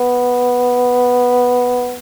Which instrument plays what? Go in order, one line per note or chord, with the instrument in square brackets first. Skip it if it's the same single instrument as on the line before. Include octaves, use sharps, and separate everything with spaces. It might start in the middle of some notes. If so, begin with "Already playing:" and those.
Already playing: [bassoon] B3